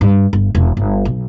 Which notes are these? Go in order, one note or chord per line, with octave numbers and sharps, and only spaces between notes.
G2
G1
E1
G1
B1